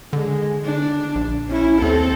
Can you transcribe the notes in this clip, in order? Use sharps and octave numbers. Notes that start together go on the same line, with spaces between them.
D3 G#3
D4
A#1
C#4 E4
D#2 C4 A4